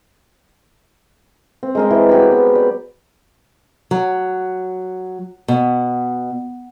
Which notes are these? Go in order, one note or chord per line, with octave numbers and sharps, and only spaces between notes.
C4
G#3 A#4 D#5
E3
F#3 G4 B5
B3
D5
F#3
B2